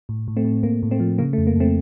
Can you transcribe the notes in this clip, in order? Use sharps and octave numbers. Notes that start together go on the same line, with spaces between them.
A2
A2
A3 C4
A2
A2 A#3
A2
A3 C4
F3
C#3 A#3
A3
F2
A#3
F2 A3 C4